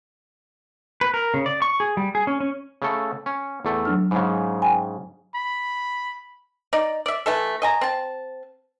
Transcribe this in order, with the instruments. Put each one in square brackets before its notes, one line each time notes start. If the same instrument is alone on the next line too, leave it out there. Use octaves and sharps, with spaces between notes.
[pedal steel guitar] B4
A#4
C#3
D5
C#6
G#4
G3
G#4
C#4
C#4
[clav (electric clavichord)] C#3 A3 A4
C#4
E2 A3
[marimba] F#3 D4 F6
[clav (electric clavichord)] G#2 C#3 [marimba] F#5 B5
[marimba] G5 G#5 B5
[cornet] B5
[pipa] D#4 D5
D5 E5
E3 A3 A4
D#5 G#5 A#5
C4 A5